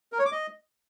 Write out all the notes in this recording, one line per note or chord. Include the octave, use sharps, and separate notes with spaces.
A#4
C#5
D6
D#5